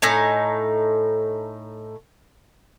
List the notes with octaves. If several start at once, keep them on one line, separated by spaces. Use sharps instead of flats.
A2 D#4 G#5